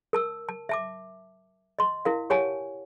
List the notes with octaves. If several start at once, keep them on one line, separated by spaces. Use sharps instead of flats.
A#4 A5 E6
A5
E5 A5 D6
D#5 C6
E4 A#4 F5
G4 C#5 F#5 G#5 A5